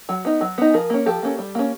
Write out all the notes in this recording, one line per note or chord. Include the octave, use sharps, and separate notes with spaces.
F#3
B3 D#4
F#3
B3 D#4
F3 G#4 A#4
A#3 C#4
F3 G4 A4
A#3 C#4
G3
A#3 C#4